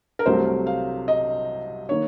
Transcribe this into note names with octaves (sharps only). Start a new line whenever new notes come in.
A#4
C2 C3 F#3 A3 C5
F5
D#5
D#3 A#3 C#5